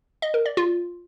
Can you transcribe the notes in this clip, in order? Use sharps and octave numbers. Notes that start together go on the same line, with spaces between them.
D#5
A#4
D5
F4